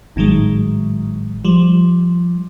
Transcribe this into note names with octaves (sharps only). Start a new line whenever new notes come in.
G#1 A2 D#3 F#3 G#3
F3 G3